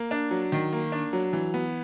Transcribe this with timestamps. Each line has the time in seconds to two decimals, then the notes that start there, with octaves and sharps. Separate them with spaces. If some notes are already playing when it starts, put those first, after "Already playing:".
Already playing: A#3
0.11 D4
0.31 F#3
0.52 D#3
0.73 A#3
0.92 D4
1.13 F#3
1.33 E3
1.54 B3